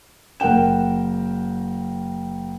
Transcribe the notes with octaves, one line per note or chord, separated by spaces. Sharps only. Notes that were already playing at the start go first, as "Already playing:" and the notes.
F#1 A#4 F#5 G5 E7